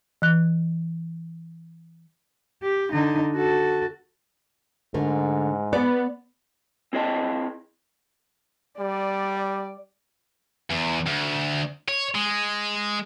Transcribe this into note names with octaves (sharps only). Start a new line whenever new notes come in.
E3 F#6
G4
D3 D#4
F#4 A4
G#2 D3 A3 A#4
B3 D5
C4 E4 G#4 D#5 G5 A5
G3 D5
E2
D2
C#5
G#3